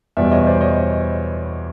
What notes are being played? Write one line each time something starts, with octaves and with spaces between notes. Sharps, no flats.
E2 B2 G3 B3 D5 E5
C#5 D#5
C5 D5
C#5 D#5